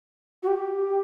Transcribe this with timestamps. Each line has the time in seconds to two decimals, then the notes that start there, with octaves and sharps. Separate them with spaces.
0.43 F#4
0.47 G4